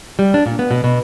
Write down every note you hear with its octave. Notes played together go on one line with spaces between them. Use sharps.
G3
D4
A#2
B3
B2
B2